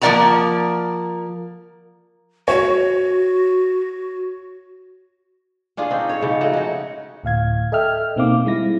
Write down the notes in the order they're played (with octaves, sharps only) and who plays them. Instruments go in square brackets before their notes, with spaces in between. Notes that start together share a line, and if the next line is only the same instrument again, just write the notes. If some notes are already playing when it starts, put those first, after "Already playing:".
[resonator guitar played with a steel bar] F3 A#3 A#4 D5 F#5 A#5
[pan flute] F#4 [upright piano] C#5
[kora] C#4 D4 F4 G#4
C4 D#4
C#5
G#2 C#3 F3
A3 D#4 F#4
C#4 D#4
[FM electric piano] D2 A2 F5 G#6
A4 D#5 E5 G5 F6
B2 A#3 C4 D#4 F5 D6
G3 G#3 E4 A#6